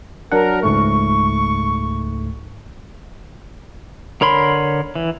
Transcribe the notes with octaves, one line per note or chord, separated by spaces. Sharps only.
F#3 D4 A#4 F#5
C#2 G#2 A3 C#6
D3 A#4 C#5 B5 C6
E3